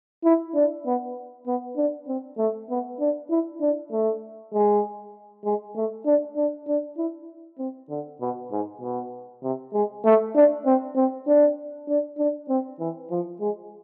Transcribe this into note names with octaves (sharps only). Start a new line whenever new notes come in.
E4
D4
B3
B3
D4
C4
A3
B3
D4
E4
D4
A3
G#3
G#3
A3
D4
D4
D4
E4
C4
D3
B2
G#2
B2
C3
G#3
A3
D4
C4
C4
D4
D4
D4
C4
E3
F3
G#3